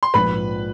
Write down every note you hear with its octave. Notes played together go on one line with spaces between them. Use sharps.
C6
A#1 G#2 F3 B4 B5